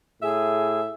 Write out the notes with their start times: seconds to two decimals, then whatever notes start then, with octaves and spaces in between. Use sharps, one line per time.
0.22 A2 G#4 E5